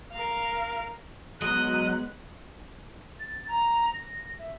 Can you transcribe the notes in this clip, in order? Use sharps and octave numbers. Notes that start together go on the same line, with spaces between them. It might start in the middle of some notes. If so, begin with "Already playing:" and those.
A#4 F5
F#3 G#3 B3 D#5 F#6
A6
A#5
A#6
E5